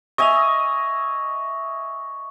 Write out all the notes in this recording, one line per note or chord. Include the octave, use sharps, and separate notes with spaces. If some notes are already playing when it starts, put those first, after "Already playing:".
D#5 E5 G#5 C#6 F7